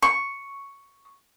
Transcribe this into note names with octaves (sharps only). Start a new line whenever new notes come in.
C#6